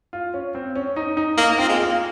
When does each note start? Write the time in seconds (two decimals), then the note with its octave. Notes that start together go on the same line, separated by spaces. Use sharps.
0.13 F4
0.34 C#4
0.55 C4
0.75 C#4
0.96 D#4
1.17 D#4
1.37 A#3 D#4
1.52 A#3
1.59 C4 F4
1.69 G#3
1.80 A#3 F4